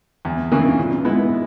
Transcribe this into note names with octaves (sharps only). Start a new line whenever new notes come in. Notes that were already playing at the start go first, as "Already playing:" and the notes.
E2
C#3 E3 A#3
A#2
G#3 B3 E4